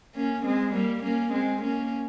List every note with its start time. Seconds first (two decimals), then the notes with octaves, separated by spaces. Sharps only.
0.15 A#3 C#4
0.45 G#3 C4
0.73 G3 A#3
1.03 A#3 C#4
1.32 G#3 C4
1.61 A#3 C#4